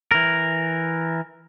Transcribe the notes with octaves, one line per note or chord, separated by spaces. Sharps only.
E3 A#4